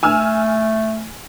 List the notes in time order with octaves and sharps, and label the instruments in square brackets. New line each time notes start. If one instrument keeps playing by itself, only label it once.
[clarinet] A3 [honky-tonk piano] G#5 E6 F6